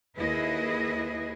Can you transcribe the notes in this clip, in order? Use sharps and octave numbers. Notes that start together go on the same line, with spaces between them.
D#2 E4 G#4 B4 D#5